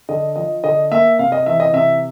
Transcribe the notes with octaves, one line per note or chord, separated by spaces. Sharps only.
D3 D#5
F3 D#5
D3 D#5
A#3 E5
C3 F5
D#5
E3 E5
D#5
C3 E5